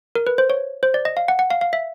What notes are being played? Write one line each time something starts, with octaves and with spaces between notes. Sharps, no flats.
A#4
B4
C5
C#5
C5
D5
D#5
F5
F#5
F#5
F5
F5
E5